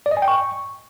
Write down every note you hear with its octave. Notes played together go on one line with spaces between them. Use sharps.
D5
D#5
G#5
G5
C#6